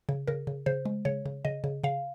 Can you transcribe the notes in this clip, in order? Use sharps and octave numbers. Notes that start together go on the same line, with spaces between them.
C#3
C#3 A#4
C#3
C#3 C5
G#3
C#3 C#5
C#3
C#3 D#5
C#3
C#3 F5